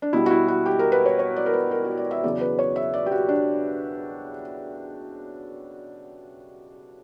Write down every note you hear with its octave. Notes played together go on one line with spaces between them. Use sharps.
D4
B2 G3 E4
F#4
E4
F#4
G4
A#4
B4
C#5
C#5
D5
A#4
B4
A#4
F#4
D5
E5
E2 C#3 F#3 D5
B4
C#5
E5
D5
G4
F#4
D4